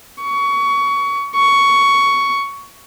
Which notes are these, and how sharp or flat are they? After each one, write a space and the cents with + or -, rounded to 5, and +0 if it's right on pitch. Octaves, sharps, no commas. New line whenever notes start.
C#6 +20
C#6 +10